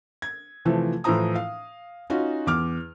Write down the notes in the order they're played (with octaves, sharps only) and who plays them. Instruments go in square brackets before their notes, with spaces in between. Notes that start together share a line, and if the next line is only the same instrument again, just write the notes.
[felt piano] G#6
C3 E3 F3 A3
A2 E3 F3 C5 A#5 D#6
F5
C#4 D#4 F4 F#4
E2 D6 F6